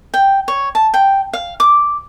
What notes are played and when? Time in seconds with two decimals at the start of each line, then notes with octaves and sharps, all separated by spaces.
0.14 G5
0.48 C#5
0.75 A5
0.94 G5
1.33 F5
1.60 D6